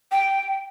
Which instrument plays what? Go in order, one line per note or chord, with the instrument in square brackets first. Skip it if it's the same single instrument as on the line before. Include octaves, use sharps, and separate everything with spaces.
[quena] G5